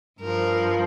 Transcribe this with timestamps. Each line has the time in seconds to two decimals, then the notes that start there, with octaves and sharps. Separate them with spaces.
0.21 G2 F3 A#4